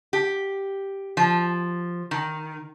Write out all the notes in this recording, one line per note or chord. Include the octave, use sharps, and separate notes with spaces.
G4
F3
D#3